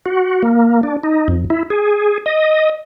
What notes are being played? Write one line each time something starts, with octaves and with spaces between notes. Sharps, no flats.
F#4
A#3
D4
D#4
F2
E4
G#4
D#5